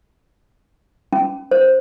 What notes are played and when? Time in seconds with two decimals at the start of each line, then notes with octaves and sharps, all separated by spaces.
1.13 C#4
1.51 C5